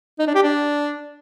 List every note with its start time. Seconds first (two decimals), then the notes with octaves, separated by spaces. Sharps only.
0.19 D#4
0.27 D4
0.35 G4
0.43 D4